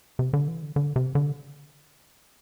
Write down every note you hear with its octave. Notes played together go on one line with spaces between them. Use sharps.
C3
D3
E3
D3
D3
C3
D3